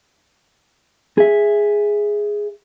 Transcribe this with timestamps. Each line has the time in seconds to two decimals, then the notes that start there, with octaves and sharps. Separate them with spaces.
1.18 G#4 E5